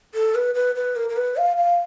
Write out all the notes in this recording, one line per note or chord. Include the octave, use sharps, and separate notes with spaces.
A4
B4
B4
B4
A#4
A#4
B4
F5
F5